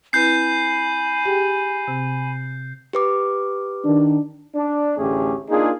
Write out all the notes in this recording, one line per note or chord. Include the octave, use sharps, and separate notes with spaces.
C4 E4 B4 G#5 B5 G6 C7
G4 G#4 G5
C3 C4
G4 B4 D6
D#3 D4
D4
A1 D2 A3 C#4 G4 G#4
A#3 D4 D#4 F4 G#4